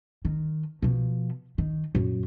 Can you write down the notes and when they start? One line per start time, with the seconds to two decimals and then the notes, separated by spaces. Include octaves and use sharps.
0.25 D#3
0.82 B2 F3
1.58 D#3
1.95 F#2 A#2